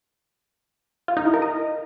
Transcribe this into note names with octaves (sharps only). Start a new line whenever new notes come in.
F4
D#4
E4
A#4
D#5